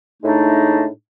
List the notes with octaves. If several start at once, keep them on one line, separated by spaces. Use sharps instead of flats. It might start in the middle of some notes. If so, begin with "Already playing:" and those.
A2 G#3 A3 D4 D#4